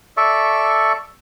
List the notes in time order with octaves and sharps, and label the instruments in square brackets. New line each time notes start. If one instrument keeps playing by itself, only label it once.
[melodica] A4 D5 E5 C#6